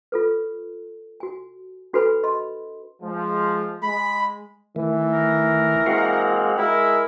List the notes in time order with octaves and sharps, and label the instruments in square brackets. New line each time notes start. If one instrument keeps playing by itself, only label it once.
[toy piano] F4 A4 B4
F#4 G#5
D4 F#4 A4 B4 G#5 B5
D#5 B5 C6
[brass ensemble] F3 G#3
[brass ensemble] G#3 [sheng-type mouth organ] B5
[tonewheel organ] D#3 A3 [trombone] E3
[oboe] A#4
[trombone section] G#3 A#3 C4 [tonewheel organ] F#4 F5 F#5
[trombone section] G#3 A#4 [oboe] E4